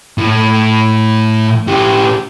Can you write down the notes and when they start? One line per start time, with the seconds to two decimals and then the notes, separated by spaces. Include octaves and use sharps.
0.18 A2
1.67 A2 G4